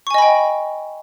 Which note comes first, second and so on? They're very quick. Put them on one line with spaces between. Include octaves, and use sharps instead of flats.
C#6 G#5 D#5 B5 G5